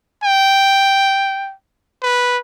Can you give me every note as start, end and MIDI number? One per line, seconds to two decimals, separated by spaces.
0.24 1.53 79
2.03 2.38 71